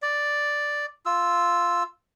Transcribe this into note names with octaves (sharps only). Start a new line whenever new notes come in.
D5
F4 E6